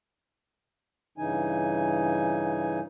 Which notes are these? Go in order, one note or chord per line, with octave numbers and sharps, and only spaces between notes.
G2 C#3 E3 D#4 G#5